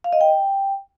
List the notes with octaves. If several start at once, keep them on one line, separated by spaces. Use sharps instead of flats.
F5
D#5
G5